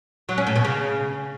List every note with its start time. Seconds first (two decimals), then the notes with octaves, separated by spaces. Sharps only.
0.29 F#3
0.38 C#4
0.47 A2
0.56 B2
0.64 C#3